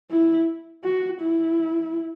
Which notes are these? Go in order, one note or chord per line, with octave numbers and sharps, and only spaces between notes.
E4
F#4
E4